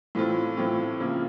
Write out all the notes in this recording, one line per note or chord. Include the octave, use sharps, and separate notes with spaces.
A2 E3 A3 C4 F4
A2 E3 A3 C4 F4
C#3 F3 A#3